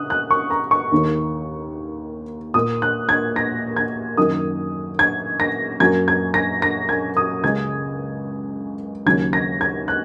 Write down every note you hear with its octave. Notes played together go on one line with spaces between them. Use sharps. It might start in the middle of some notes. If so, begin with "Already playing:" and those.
Already playing: C#3 D#6 F#6
F#6
C#6
A#5
C#6
D#2 D#3 A#3
A#2 A#3 D#6
F#6
G#6
A#6
G#6
F#2 D#3 A#3 D#6
G#6
A#6
F#2 F#3 A#3 G#6
G#6
A#6
A#6
G#6
D#6
C#2 C#3 G#3 G#6
D#2 C#3 F#3 G#6
A#6
G#6
F#6